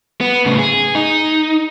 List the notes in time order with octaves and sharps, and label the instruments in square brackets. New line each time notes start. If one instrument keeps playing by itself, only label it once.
[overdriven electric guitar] B3
A2 C#3
G#4
D#4